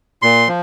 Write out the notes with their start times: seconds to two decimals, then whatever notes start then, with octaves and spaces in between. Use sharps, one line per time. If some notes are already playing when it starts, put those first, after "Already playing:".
0.22 A#2 C6
0.48 F3